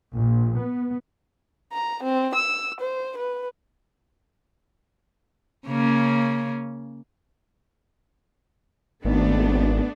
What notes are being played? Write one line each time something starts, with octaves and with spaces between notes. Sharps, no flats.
A#1
B3
A#5
C4
E6
C5
B4
C#3 A#3 C#4
G#1 A3 B3 D4